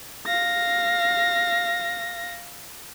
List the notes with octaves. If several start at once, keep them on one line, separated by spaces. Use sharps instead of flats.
F5 A#6